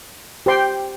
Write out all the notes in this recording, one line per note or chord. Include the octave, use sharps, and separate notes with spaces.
G4 C5 G5 C6